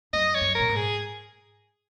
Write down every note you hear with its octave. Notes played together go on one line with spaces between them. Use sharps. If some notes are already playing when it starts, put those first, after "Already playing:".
F#2 D#5
C#5
F#2
A#2 A#4
G#2
G#4